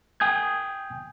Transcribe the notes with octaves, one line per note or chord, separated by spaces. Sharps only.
G5 G#5 D#6 G6 G#6